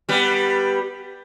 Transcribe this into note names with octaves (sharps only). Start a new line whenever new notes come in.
G3 B3